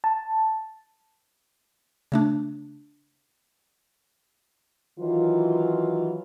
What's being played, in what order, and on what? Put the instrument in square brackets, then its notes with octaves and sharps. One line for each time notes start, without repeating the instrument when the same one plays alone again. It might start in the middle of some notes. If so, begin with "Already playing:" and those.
[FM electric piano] A5
[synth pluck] C#3 A3 D4
[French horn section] D#3 E3 F#3 F4